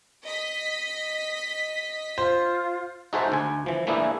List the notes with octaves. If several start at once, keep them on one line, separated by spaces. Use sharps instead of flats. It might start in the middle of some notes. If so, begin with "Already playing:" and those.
D#5 B6
F4 C5
D#4 F#4 G#4 A4 C5 E5
D2 G#5
E3 F3
E3 A3 A#3 D4 E4 G#4